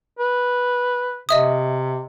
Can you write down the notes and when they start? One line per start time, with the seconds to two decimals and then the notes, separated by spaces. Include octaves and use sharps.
0.19 B4
1.29 C3 D#5 E5 D#6